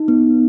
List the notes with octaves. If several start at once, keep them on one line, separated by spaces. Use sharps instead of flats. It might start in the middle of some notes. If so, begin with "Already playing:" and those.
Already playing: D#4
B3